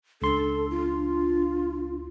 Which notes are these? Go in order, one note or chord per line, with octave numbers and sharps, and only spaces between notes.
C#2 D4 A4 C6
F4